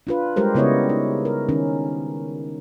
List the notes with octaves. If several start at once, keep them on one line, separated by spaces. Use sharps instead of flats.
D4 F4 B4
G3 G#3 G4 A#4 C5
C#3 B3 E4 C#5 D#5
D#4
A#4
D#3 C#4 D#4